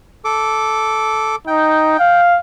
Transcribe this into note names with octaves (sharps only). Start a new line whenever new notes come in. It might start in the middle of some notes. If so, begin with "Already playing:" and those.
A4 D6
D#4 G5
F5